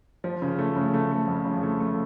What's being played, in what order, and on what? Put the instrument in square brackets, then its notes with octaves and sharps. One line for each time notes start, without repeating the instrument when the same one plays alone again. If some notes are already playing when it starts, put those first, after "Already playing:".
[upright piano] F3
C#3
A3
C#3
A3
A3
F2
C#3
A3
A3